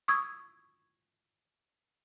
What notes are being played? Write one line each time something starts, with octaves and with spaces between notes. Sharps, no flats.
C#6 D#6 E6 G#6